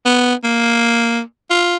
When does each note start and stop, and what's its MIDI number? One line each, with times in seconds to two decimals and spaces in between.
0.06 0.34 59
0.44 1.21 58
1.50 1.76 65